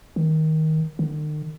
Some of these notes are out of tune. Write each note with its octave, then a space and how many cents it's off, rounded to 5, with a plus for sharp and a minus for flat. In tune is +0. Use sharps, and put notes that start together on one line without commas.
D#3 +15
D#3 -45